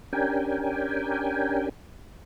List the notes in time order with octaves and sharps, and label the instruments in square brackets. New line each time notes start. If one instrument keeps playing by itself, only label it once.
[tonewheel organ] C#4 D4 G4 A#4 G5 G#5